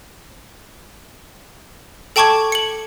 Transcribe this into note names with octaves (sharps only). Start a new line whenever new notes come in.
A4 G5 A5 C#6 D6 G#6
C#7 F#7